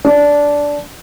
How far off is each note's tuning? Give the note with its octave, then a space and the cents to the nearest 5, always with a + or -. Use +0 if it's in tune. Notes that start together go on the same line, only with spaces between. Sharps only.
D4 -10